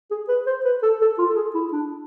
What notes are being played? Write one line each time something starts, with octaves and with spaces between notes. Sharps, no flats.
G#4
B4
C5
B4
A4
A4
F4
A4
G#4
E4
D4